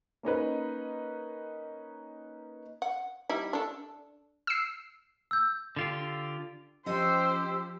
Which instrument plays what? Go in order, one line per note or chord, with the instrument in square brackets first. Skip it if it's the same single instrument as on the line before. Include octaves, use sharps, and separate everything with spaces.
[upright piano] A#3 C#4 D#4 B4
[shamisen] F#5
G3 D#4 E4
D4 A4
[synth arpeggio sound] E6 C7
[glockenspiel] E6 G6
[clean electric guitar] D3 F4 G4
[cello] F3 [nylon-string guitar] C#4 D#5 [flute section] G4 E6 [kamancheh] C5